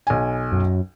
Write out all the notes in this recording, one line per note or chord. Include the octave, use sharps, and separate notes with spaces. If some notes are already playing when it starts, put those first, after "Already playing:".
B1 G#5
F#2